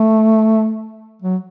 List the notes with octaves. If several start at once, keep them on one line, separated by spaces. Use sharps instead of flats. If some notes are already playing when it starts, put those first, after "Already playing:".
Already playing: A3
F#3